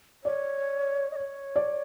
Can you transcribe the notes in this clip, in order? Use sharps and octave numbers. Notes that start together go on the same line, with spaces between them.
C#5 D5
D#5
C#5
D5